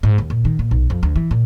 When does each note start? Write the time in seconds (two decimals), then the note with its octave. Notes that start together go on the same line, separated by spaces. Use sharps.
0.03 G#2
0.18 D#2
0.30 A#2
0.45 D#3
0.59 A#2
0.71 B1
0.90 F2
1.03 D2
1.16 E3
1.31 A#2